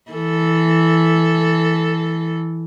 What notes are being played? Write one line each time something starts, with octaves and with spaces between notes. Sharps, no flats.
E3 A4